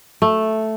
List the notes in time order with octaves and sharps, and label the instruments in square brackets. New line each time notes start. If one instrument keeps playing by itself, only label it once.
[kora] A3